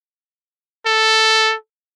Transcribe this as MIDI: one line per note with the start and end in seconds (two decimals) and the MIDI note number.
0.86 1.55 69